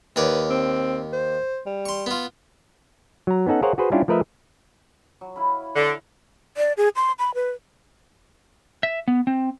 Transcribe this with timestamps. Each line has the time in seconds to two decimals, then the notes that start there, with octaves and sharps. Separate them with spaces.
0.16 D#2 B4 C#5 D5
0.50 C4
1.13 C5
1.66 G3
1.86 C6 C#6
2.06 B3 F4
3.27 F#3 A#5
3.46 B3 C#4 D#4 A4 F#5
3.62 G#4 A#4 C5 C#5 F5 F#5
3.78 F#4 G#4 B4 C5
3.92 G3 C#4 D4 E4 F4 G4
4.08 F3 A3 A#4 B4 D#5 E5
5.21 F#3
5.36 E4 F5 B5
5.76 D3
6.57 D5
6.77 G#4
6.96 C6
7.19 B5
7.34 B4
8.83 E5
9.08 B3
9.27 C4